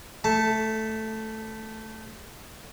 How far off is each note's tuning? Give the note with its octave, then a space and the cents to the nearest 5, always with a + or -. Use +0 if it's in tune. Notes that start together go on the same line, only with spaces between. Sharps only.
A3 +0 A5 +0